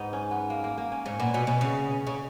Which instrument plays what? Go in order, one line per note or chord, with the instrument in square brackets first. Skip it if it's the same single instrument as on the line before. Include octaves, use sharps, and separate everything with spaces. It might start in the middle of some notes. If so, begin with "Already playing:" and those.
Already playing: [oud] G#2 [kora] B3 D#4
[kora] C#4
B3
A#3
A#3
A#3
C#4
[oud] G#2 [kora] C#4
[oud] A#2 [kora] B3
[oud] B2 [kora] C#4
[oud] B2 [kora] C#4
[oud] C#3
[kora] C#4
[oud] C#3